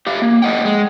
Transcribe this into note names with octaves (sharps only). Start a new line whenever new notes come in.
G4 E5 F5
A#3
F2 A3 D#5 F#5 G5
G#3